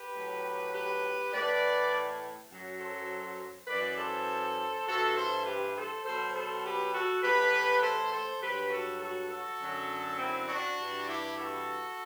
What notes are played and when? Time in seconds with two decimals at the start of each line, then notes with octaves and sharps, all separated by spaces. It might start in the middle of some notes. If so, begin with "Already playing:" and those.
Already playing: G4 B4
0.14 A2 F#3
0.72 G4 B4
1.32 A2 E3 B4 D5
2.49 F#2 F#3
2.79 A4 C5
3.67 F#2 E3 B4 D5
3.97 A4 C5
4.86 G2 E3 F#4 A4
5.15 A4 C5
5.45 G4 B4
5.74 A4 C5
6.04 B2 F#3 A4 C5
6.34 A4 C5
6.63 G4 B4
6.92 F#4 A4
7.22 A2 E3 G4 B4
7.81 A4 C5
8.11 A4 C5
8.41 G2 F#3 G4 B4
8.70 F#4 A4
9.00 F#4 A4
9.29 F#4 A4
9.58 F#2 D3 F#3
10.18 C4 E4
10.47 D4 F#4
10.77 G2 E3
11.07 E4 G4
11.36 F#4 A4